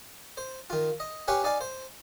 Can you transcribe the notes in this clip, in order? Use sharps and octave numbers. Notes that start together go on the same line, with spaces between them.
C5
D#3 F4
D#5
G4 B4 C#5 F5 G#5
D#4 D5 F5 G#5
C5